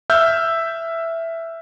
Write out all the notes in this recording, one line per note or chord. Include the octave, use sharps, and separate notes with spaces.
E5 E6 F6 G6